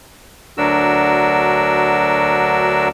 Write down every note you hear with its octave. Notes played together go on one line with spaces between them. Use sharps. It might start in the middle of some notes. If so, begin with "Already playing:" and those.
D2 F#3 D4 F#4 A#4 E6